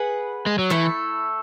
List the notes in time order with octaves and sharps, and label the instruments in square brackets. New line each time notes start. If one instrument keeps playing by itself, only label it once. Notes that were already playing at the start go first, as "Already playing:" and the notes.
Already playing: [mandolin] G#4 B4 F#5
[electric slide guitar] G#3
F#3
[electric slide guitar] E3 [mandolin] A3 E4 A4